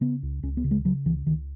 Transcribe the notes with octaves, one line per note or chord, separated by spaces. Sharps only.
C#3 B3
C#2
C#2 C#4
B3
C#3
G#3
C#3 F#3
C#2 E3
C#2 D#3